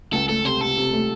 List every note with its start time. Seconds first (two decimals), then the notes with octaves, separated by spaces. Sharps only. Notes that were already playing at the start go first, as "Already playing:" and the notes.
0.13 C#2 A4
0.29 A3 A4
0.44 C3 C5
0.61 C3 A4
0.77 C3
0.93 A3